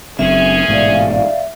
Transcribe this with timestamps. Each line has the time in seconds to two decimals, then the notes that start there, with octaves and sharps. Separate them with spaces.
0.19 F#1 F#2 C4 C#4 G#4 E5
0.68 A1 G#2 B2 D5 F5